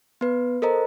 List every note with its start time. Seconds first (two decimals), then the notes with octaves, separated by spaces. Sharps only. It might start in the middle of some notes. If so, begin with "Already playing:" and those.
0.21 B3 B4
0.62 A4 A#4 C5 D#5 A#5